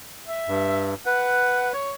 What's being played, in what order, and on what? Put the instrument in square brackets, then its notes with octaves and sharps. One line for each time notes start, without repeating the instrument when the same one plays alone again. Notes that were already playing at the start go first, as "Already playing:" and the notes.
[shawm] E5
[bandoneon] G2
[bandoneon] B4 [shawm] F#5
[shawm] C#5